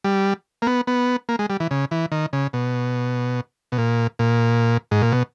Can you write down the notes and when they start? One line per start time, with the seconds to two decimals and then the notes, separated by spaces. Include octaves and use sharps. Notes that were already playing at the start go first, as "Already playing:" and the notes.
0.04 G3
0.62 A#3
0.67 B3
0.87 B3
1.29 A#3
1.39 G#3
1.50 G3
1.60 E3
1.71 C#3
1.91 E3
2.12 D#3
2.33 C#3
2.53 B2
3.72 B2
3.78 A#2
4.19 A#2
4.91 G#2
5.02 A#2
5.12 B2